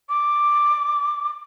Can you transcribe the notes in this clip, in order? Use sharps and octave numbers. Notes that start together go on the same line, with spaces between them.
D6